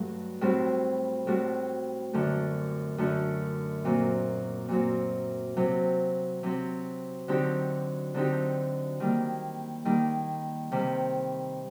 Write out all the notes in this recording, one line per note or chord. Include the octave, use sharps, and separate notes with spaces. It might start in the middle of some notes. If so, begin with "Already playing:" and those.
Already playing: G2 F#3 A3
A2 G3 C4 F#4
A2 G3 C4 F#4
F#2 D3 A3
F#2 D3 A3
A#2 F#3 C4
A#2 F#3 C4
C3 F#3 C4
C3 F#3 C4
D3 F#3 C4 D#4 G4
D3 F#3 C4 D#4 G4
D#3 G3 A#3
D#3 G3 A#3
C3 D#3 G3